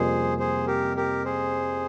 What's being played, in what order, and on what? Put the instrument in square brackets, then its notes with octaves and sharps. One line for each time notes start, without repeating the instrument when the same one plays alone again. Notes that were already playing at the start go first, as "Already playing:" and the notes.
Already playing: [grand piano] F2 C3 G3 A#3 F4 [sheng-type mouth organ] G#4 C5
[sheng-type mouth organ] G#4 C5
G4 A#4
G4 A#4
G#4 C5